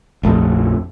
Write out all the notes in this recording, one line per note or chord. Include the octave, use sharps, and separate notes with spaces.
A#1 F2 A3